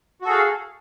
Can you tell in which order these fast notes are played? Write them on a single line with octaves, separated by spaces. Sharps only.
F#4 A4 G#4 F5